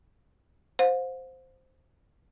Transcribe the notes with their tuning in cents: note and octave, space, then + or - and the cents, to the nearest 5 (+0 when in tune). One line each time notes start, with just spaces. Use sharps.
C5 +0 F5 +45